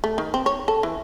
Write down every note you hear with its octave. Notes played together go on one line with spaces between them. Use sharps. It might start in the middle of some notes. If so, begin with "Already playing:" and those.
A3
D#3
C4
C#5
A4
E3